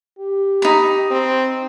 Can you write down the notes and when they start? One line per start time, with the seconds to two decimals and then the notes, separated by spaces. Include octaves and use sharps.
0.19 G4
0.62 D#4 B5
1.10 C4